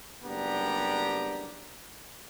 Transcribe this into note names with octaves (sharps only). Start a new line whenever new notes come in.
F#1 G3 B3 D4 G4 A#5